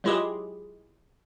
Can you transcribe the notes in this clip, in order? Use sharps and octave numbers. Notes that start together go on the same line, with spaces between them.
F#3 G#3 E4 F4 G4 G#4